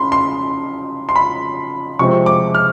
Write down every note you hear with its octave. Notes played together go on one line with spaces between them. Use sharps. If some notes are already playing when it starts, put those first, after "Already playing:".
Already playing: C#3 B5 C6
C6
C6
B5
C3 F3 G#3 C4 C#6
D6
F6